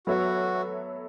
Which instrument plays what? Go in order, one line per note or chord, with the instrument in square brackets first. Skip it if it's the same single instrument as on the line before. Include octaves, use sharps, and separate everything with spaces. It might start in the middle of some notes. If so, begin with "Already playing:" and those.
[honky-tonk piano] F#3 B3 A4 C#5 E5 [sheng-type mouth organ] F#4